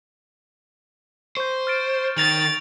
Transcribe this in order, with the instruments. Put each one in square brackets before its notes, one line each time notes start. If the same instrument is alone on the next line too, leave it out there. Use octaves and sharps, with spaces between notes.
[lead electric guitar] C5 [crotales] C#6 G6
[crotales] F6 A6 D7
[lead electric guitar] D#3 [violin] A6 [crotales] A#6 F7 F#7